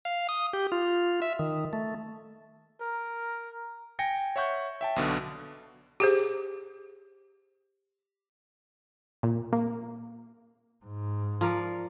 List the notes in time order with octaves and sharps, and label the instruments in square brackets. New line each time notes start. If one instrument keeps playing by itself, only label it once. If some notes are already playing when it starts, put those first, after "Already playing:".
[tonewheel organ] F5
D#6
G4
F4
E5
D#3
A3
[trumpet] A#4
[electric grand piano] G5 G#5 A#6 C#7
C#5 E5 F#5 C#6 G6
E5 G5 A5
B1 B2 D3
[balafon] G4 G#4 C5
[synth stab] A#2
A#3
[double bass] G#2
[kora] F3 A#4 D5